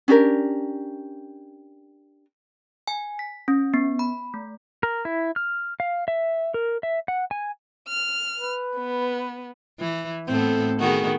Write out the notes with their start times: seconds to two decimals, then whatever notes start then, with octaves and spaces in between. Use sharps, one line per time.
0.08 C#4 D4 G4 A#4
2.88 G#5
3.19 B6
3.48 C#4
3.74 B3
3.99 B5
4.34 A3
4.83 A#4
5.05 E4
5.36 F6
5.80 F5
6.08 E5
6.54 A#4
6.83 E5
7.08 F#5
7.31 G#5
7.89 F6
8.38 B4
8.76 B3
9.80 E3
10.28 A2 B3 C4 A4
10.80 D#3 B3 F#4 G#4